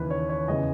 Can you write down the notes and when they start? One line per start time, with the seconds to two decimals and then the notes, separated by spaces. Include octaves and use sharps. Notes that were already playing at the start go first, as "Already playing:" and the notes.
Already playing: D#2 C#3 E3 B4
0.10 C#5
0.29 C#5
0.48 E2 C#3 E3 D#5